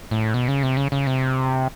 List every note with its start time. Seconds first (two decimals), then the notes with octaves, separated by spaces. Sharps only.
0.11 A2
0.34 B2
0.48 C#3
0.63 C3
0.77 C#3
0.92 C#3
1.07 C3